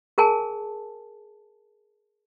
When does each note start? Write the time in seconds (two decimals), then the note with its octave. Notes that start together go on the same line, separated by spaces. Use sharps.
0.18 G#4 A#4 G#5 A5